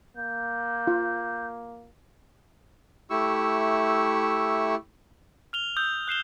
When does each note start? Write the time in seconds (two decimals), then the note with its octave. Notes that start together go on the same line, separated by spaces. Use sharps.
0.16 A#3 G6
0.87 F4
3.10 A3 E4 G4 C#6 E6
5.53 F6 F7 G7
5.76 D#6 E6 G6
6.08 F#6 C7 E7 G7